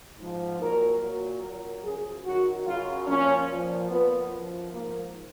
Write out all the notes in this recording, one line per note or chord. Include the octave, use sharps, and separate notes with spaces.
G#2 F3
A#2 F#3 A#4
A#2 F#3
A#2 F#3 A#4
F#2 C#3 F3 G#4
F#2 D#3 F#3 F#4
F#2 C#3 F#3 F4
A#2 F3 C#4
A#2 F3
A#2 F3 B3
F#2 F3
G#2 F3 A#3